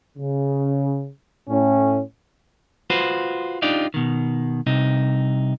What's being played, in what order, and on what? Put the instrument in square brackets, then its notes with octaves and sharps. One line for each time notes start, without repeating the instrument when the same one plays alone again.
[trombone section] C#3
A2 C#4
[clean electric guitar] F4 F#4 B4 C5
D4 D#4 F4 G4 D5
B2 D#3
C2 C3 D#4